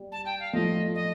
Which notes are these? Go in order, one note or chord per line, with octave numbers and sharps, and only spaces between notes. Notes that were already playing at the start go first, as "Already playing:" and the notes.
Already playing: G3
A5
G5
F5
F3 A3 D#5
D#5